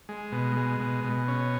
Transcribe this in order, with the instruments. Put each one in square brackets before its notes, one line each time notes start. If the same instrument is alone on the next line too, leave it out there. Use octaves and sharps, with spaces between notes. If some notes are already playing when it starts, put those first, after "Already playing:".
[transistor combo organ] G#3
B2
G#3
B2
B2
C#4